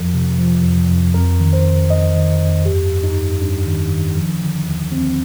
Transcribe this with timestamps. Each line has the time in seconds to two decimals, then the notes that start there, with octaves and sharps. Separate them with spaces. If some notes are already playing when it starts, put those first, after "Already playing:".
Already playing: F2 F3 A#4
0.14 C3
0.39 F3
0.64 F2
0.89 F2
1.14 F2 A#4
1.40 D#3
1.53 C5
1.64 F2
1.90 F2 D#5
2.15 D#3
2.41 F2
2.65 G2 G4
2.91 G2
3.04 D#4
3.16 G2
3.41 G2 D4
3.66 D#3
3.92 D#3
4.17 F3
4.42 D3
4.67 D#2
4.92 D#2 C4